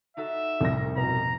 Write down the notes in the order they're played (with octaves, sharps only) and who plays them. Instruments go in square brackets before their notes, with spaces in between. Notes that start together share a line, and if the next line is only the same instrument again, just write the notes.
[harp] D#4 F#4 A4 [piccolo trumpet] E5
[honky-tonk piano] C2 G3 A#6 [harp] F2 A2 G5
[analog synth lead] B2 [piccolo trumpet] A#5